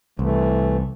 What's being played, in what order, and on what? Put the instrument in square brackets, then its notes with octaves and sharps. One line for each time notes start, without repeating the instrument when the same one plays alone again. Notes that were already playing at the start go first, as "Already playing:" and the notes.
[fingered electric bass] C2 [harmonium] E3 A3